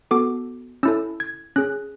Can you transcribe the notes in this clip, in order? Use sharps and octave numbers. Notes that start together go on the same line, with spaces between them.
B3 F#4 A4 D6
C#4 E4 A4 E6
G#6
C#4 G#4 F#6